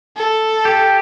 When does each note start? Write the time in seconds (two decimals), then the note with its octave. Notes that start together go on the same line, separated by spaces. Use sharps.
0.16 A4
0.65 G4